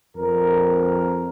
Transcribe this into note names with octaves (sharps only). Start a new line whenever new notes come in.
F2 A#4